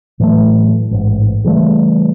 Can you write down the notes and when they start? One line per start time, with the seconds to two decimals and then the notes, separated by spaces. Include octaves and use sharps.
0.19 A2 E3 F#3 A3
0.91 A1 G#2
1.44 C#3 E3 G3 A3